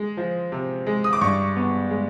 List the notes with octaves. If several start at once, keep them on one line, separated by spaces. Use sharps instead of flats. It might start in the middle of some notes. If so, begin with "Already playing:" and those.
Already playing: G#3
F3
C3
G#3
D#6
D6
G2 C#6
B3
G#3